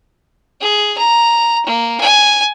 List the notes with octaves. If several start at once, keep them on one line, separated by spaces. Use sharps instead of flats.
G#4
A#5
A#3
G#5